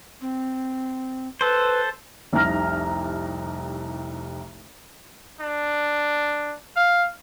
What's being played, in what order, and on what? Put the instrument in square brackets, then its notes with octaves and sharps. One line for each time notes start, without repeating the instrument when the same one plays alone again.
[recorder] C4
[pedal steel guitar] A4 C5 [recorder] B4
[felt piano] F1 C2 D#4 A#5 F6 A#6
[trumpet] D4
F5